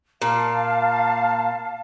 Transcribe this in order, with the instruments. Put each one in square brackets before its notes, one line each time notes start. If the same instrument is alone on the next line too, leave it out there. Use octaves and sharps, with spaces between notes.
[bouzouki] A#2 [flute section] F5 A5